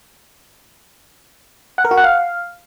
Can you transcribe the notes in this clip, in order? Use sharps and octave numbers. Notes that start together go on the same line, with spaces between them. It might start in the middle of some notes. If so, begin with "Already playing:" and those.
F#5
A#4
F#4
F#5
F5